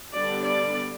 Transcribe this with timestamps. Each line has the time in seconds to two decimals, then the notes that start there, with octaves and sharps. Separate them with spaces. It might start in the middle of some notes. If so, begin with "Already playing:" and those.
0.13 D3 G3 B3 D4 D5
0.44 D5